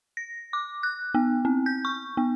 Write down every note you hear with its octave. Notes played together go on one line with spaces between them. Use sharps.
A#6
D6
F#6
B3
C4
G6
C#6
B3